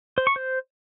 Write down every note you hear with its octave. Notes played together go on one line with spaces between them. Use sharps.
C5
C#6
C5